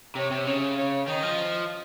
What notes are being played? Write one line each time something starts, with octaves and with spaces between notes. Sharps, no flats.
C3 C#5
C3
C#3 C#5
C#5
D#3 D#5
F3